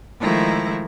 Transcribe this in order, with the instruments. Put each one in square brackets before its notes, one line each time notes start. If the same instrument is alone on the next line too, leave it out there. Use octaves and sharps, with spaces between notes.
[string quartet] D#3 F3 G#3 A3 E4 A#5